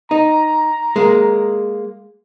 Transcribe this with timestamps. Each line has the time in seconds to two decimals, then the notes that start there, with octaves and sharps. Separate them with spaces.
0.11 D#4 A#5
0.96 G#3 A#3